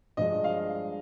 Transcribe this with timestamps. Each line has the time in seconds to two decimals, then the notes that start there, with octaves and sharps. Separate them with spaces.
0.17 G2 F3 G#3 D#5
0.44 F5